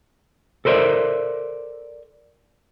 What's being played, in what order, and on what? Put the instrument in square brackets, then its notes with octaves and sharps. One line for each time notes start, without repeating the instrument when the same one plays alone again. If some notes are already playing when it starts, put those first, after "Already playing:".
[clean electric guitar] A4 A#4 C5 D5 E5